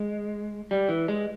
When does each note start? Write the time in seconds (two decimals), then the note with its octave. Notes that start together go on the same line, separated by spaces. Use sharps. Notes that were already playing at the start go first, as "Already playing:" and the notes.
Already playing: G#3
0.71 G3
0.89 E3
1.08 G#3